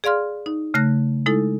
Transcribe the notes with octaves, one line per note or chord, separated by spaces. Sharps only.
G#4 D5 F5 C6 F6
D#4
C#3 A3 F#6 A#6
G#3 D#4 E4 A4